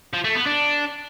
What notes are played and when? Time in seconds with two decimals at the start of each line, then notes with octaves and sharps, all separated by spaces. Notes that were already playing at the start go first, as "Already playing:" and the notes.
0.13 F3
0.24 A3
0.35 B3
0.46 D4